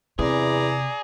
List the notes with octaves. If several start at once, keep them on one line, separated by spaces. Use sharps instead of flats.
E2 C3 G#4 D5 A#5